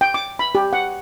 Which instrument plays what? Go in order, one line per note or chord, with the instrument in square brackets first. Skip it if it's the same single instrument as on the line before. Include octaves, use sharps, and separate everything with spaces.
[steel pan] G5
D6
B5
G4
F#5